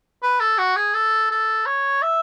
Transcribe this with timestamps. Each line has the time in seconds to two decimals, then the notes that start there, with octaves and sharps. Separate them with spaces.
0.23 B4
0.40 A4
0.58 F#4
0.76 G#4
0.94 A4
1.31 A4
1.66 C#5
2.02 E5